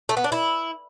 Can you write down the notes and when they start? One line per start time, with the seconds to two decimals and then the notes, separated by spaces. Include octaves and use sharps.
0.09 A3
0.17 B3
0.24 D4
0.32 E4